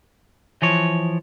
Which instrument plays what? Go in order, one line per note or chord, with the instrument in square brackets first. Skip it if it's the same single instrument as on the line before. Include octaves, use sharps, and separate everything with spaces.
[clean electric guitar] E3 F3 C#5